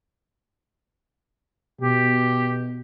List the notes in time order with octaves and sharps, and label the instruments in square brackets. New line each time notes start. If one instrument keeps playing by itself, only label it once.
[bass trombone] B2 [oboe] G4